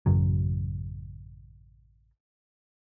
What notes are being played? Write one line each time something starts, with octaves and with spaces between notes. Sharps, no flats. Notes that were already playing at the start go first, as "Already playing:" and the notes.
A1 F#2 C#3 F#3